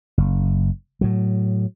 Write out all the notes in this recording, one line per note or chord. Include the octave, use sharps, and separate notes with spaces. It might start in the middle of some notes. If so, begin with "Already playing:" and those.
F#1
A2 F#3